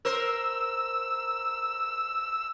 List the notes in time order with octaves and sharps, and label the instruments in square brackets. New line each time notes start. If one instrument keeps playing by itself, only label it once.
[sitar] A#4 C5 [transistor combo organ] E6